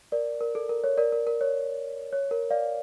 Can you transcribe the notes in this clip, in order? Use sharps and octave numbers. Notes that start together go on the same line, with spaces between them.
A#4 D5
A#4
A4
A#4
C#5
A#4 D5
A#4
A#4
C#5
C#5
A#4
D5 F5